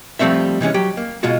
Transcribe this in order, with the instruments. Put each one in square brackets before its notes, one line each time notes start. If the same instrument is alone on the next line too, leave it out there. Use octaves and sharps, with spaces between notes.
[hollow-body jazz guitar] F3 G3 A3 C4 E5
C3 E3 G#3 C#4
F#3 G4
A#3
B2 G#3 F4 F#4